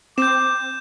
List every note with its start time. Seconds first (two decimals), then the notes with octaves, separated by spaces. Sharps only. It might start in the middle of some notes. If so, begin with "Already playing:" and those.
0.18 C4 D6 G6 E7